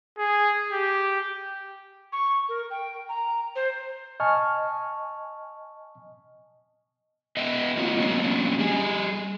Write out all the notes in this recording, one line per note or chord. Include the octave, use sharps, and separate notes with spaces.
G#4
G4
C#6
A#4
G5
A#5
C5
D#5 G#5 A5 C#6 F6
B3 B4 D#5 E5 G5
A#3 C4 F4 F#4 C#5
F#3 G#3 A#3 B3 C#4 D4
G3 G#4